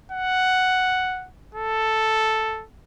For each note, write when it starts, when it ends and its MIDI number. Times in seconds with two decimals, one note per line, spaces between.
0.12 1.28 78
1.55 2.65 69